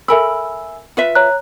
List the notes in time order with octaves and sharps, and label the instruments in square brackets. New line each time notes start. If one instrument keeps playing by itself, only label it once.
[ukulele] A4 A#4 B5 [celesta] E5 G#5 E6
[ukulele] F4 B4 E5
[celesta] C#5 A#5 F#6